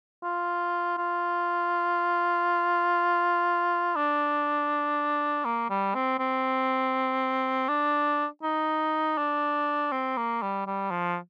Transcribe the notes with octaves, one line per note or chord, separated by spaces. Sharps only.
F4
F4
D4
A#3
G3
C4
C4
D4
D#4
D4
C4
A#3
G3
G3
F3